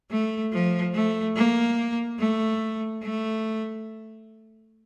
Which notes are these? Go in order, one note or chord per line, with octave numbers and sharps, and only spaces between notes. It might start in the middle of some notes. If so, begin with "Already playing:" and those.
A3
F3
A3
A#3
A3
A3